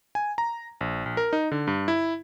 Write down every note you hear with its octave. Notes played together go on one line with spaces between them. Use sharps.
G#5
A#5
A#1
A#1
A#4
D#4
D3
G2
E4